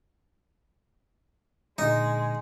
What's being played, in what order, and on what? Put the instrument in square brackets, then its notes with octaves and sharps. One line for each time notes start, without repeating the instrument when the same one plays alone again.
[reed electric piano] A#2 D3 [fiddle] G#3 [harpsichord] D#4